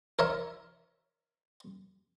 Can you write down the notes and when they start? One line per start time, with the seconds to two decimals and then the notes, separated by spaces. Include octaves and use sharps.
0.19 A#4 C#5 E5